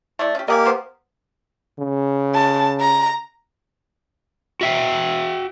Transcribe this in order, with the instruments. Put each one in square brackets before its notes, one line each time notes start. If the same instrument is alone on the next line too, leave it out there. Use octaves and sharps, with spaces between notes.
[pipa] A3 E4 D5
C#4 G4
[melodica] A#3 G4 A#4 [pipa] D#5 F#5 G#5
[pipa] B3 C5
[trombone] C#3
[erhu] A5
A#5
[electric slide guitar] F#4 E5 G5